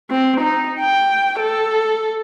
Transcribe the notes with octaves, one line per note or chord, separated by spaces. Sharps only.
C4
D#4
G5
A4